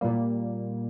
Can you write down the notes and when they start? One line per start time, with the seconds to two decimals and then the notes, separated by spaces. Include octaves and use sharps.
0.01 A#2 G3 A#3